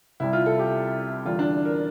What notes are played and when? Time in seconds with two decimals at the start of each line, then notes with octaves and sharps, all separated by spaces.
0.20 C2 C3 G3 E4
0.33 F4
0.46 A4
0.59 G4
1.25 E2 D3 G3 F4
1.39 D4
1.65 A#4